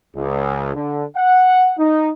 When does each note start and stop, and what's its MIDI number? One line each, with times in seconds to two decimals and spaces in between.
0.16 0.75 37
0.75 1.04 50
1.16 1.72 78
1.78 2.10 63